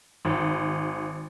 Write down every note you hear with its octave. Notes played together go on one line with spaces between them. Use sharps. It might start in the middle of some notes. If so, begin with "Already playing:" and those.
G#1